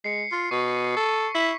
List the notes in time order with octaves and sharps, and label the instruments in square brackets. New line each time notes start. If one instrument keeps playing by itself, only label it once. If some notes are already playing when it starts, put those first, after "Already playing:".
[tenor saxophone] G#3 [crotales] C7 C#7
[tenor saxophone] F4
[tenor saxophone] B2 [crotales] C#6
[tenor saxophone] A4
[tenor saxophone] E4 [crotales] B6